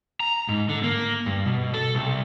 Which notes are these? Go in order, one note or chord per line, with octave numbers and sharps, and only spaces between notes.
A#5
G#2
D3
A#3
G2
B2
A4
C2